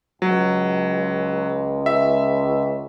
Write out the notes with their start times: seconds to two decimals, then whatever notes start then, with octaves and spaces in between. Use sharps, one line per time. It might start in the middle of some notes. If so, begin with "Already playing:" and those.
0.22 C#2 F#3
1.86 E5